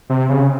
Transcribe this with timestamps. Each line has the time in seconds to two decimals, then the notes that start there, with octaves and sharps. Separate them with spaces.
0.10 C3 C4
0.29 C#3